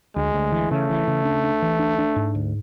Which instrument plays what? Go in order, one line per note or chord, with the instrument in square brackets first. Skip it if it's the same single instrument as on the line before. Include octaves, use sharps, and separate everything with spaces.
[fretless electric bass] D2 [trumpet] G#3
[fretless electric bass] D2
E3
[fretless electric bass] C#3 [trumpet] A3
[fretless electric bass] E3
C#3
D4
D4
E3
D4
D4
G#2
D2